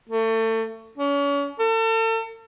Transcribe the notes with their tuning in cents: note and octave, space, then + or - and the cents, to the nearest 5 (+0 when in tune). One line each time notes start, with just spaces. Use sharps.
A3 +30
C#4 +35
A4 +40